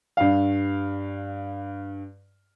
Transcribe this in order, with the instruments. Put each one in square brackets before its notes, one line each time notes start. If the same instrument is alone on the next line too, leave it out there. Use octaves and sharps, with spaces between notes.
[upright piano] G2 F5